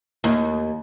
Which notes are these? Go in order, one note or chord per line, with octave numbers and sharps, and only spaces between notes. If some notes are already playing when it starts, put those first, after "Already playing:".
D#2